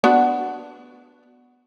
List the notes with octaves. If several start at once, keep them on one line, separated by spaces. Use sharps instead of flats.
B3 D4 F#4